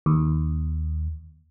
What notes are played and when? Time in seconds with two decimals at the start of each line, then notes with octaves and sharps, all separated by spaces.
0.06 D#2